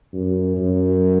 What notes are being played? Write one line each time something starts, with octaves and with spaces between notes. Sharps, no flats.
F#2
F#2